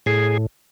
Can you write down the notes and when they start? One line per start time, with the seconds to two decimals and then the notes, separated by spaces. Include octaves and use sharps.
0.06 A2 G#4